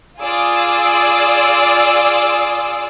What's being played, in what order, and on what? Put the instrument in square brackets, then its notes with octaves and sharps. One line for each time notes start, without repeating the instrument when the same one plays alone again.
[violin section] F4 G#4 D5 D6 E6